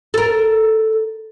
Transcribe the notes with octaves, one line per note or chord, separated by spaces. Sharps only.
A4 A#4